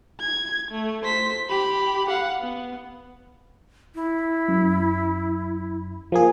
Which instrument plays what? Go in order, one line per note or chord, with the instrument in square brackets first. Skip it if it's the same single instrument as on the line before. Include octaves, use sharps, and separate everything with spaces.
[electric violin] G#6
A3
C5 B6
G4 B5
F5 F#5
B3
[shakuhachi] E4
[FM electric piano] F#2
F3 A#3 G#4